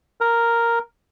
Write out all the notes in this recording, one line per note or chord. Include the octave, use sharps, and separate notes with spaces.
A#4